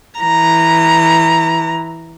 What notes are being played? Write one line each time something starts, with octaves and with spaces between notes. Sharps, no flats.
E3 A#5